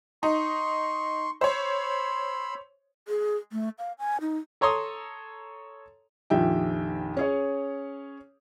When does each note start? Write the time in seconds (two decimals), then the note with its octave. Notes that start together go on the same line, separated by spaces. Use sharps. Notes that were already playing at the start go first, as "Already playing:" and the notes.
0.23 D#4 C6 C#6
1.41 C5 C#5 B5 C6 E6
3.08 G#4
3.52 A3
3.79 F5
3.99 G#5
4.21 D#4
4.61 A4 C#5 A#5 C6 D#6
6.30 A#1 F2 D#3 G4 E5 G5
7.17 C#4 G#4 C#5